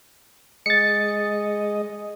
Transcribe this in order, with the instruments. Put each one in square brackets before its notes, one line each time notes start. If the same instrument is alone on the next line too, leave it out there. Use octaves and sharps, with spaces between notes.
[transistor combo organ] G#3 D#5 [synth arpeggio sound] A6 C#7